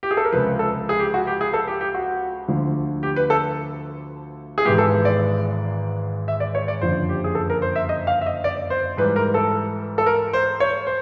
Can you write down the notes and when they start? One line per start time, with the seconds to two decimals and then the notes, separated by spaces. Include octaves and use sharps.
0.03 G4
0.11 G#4
0.17 A4
0.25 A#4
0.32 C#2 C3 F3 B4
0.59 A4
0.89 G#4
0.99 G4
1.14 F#4
1.27 G4
1.41 G#4
1.53 A4
1.68 G4
1.81 G4
1.94 F#4
2.48 D2 D3 F3
3.03 G4
3.16 B4
3.30 A4
4.58 G#4
4.65 G#1 G#2 E3 G#3 B3 G4
4.78 A4
5.05 D5
6.28 E5
6.40 D5
6.55 C#5
6.68 D5
6.81 F#1 F2 D3 F3 C5
7.09 G4
7.24 G#4
7.35 A4
7.50 A#4
7.62 C5
7.76 E5
7.89 D#5
8.07 F5
8.21 E5
8.26 D#5
8.44 D5
8.70 C5
8.97 G#2 E3 G3 B4
9.16 A#4
9.34 A4
9.98 A4
10.06 A#4
10.33 C5
10.60 C#5
10.87 C5